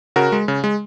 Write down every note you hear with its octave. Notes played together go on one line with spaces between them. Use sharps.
C#3 F#4 A#4
G#3
C#3
G#3